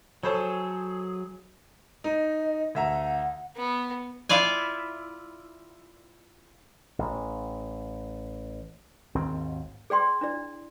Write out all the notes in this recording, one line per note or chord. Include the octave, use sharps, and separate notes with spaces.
F#3 G#4 A4 C5 C#5
D#4 D#5
D2 E5 F#5 A#5
B3
E4 F4 D5 G#5
A1
G#1 D#2 C4
G#4 D5 G5 C6
D4 E4 D5